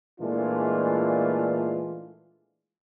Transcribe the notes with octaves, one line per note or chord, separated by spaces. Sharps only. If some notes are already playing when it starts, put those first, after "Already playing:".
A#2 E3 G#3 A3 D4 F4